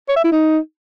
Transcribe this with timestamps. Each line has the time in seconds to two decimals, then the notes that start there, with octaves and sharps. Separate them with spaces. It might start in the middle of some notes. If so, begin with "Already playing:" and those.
0.09 C#5
0.16 E5
0.24 E4
0.32 D#4